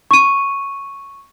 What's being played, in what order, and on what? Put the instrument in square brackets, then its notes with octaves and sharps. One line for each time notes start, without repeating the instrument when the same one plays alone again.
[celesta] C#6 D#7